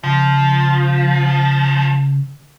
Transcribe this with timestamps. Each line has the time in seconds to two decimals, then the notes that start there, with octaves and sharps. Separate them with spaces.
0.04 C#3 F3